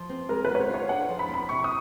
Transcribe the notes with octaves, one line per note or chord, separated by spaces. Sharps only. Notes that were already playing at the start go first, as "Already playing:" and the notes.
Already playing: F3
C4
G#3 A#4
B3 B4
C#5
C5
F4 C#5
D3 F#5
F3
B5
C4
B5
C3 C#6
D#6